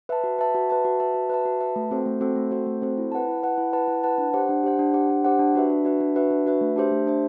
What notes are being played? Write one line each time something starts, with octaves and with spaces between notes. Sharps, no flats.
B4 E5 A5
F#4
B4 E5 A5
F#4
B4 E5 A5
F#4
B4 E5 A5
F#4
B4 E5 A5
F#4
B4 E5 A5
A3
C4 F#4 A4 C5
A3
C4 F#4 A4 C5
A3
C4 F#4 A4 C5
A3
C4 F#4 A4 C5
E4
B4 F#5 A5
E4
B4 F#5 A5
E4
B4 F#5 A5
E4
B4 F#5 A5
D4
G4 C5 F#5
D4
G4 C5 F#5
D4
G4 C5 F#5
D4
G4 C5 F#5
D4
F#4 B4 E5
D4
F#4 B4 E5
D4
F#4 B4 E5
D4
F#4 B4 E5
A3
D4 G4 C5 E5
A3
D4 G4 C5 E5